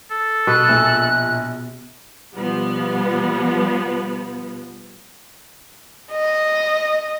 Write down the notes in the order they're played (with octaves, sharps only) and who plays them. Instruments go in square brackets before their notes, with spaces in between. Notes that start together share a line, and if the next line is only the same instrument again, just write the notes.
[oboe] A4
[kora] B2 B4 [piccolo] F#6
[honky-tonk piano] A#1
[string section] B2 F3 G3 B3
[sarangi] D#5